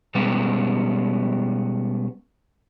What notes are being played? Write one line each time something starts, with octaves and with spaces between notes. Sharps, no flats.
B2 G3 G#3 B3 C#4